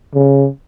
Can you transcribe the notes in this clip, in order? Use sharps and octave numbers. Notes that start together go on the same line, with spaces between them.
C#3